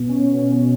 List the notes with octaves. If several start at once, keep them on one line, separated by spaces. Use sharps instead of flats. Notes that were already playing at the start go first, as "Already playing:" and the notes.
Already playing: B2
C#4
B2
C#4